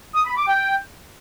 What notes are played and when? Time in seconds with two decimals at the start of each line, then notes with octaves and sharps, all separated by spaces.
0.15 D#6
0.26 B5
0.36 D6
0.47 G5